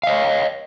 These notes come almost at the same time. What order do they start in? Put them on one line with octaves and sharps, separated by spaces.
F5 D#5 C#5